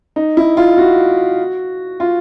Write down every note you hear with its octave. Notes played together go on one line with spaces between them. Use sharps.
D#4
E4
F4
F#4
F4